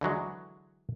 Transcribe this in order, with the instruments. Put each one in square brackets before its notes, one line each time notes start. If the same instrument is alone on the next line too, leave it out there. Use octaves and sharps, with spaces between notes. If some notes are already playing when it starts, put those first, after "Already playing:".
[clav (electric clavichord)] D3 E3 F#3 G#3